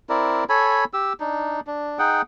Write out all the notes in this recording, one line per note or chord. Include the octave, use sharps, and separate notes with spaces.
C4 E4 A#4 D5
A4 C#5 G#5 B5
G4 E6
D4 D#4
D4
D#4 G#4 F#5 G5